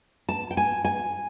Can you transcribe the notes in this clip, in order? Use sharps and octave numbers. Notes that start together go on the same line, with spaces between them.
A5
G5
G#5
G#5